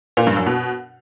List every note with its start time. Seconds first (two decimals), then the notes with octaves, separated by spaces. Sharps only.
0.17 A#2
0.27 G2
0.37 F#2
0.46 B2